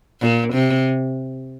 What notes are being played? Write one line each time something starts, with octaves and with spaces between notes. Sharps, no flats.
A#2
C3